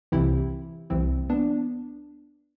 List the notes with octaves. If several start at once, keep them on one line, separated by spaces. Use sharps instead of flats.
C2 C3 E3 E4 G4
C2 C3 E3 C4 E4
B3 D4